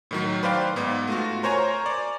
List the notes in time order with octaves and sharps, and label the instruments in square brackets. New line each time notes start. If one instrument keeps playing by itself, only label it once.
[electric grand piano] A2 D#3 F#3
B4 C5 D5 F5 G5
G#2 B3
A3 F4 F#4
A#4 C5 C#5 G#5 A#5
D5